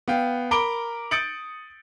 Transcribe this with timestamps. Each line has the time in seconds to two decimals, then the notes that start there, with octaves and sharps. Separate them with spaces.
0.08 B3 F5 G5
0.51 A#4 A#5 B5 D6 D7 G7
1.11 D#6 G6 A6 C#7 D7 F#7